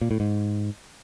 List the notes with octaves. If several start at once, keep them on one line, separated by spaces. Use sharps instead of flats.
A#2
A2
G#2